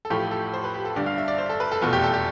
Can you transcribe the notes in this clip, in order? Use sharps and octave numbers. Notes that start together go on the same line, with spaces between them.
A4
A1 A2 F3 A3 G4
A4
C5
B4
G4
A4
G1 G2 D3 D5
F5
E5
D5
C5
A4
B4
A4
F1 E2 B2 A3 F4
G4
A4
G4